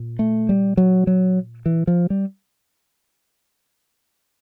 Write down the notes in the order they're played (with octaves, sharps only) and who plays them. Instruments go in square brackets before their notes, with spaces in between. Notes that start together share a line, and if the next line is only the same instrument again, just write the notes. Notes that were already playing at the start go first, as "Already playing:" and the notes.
Already playing: [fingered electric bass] A#2
A3
G3
F#3
F#3
E3
F3
G3